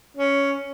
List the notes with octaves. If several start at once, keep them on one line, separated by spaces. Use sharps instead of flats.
C#4